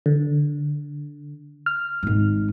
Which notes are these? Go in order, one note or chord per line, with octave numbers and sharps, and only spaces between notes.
D3
F6
G#1 G#2